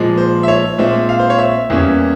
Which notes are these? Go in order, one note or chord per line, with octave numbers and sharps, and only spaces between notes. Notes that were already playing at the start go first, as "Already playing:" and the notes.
Already playing: A#2 F3 G#3
C5
E5
C#5
A#2 G#3 C4 E5
F5
C5
C#5
E5
E2 E3 G3 A#3 C#4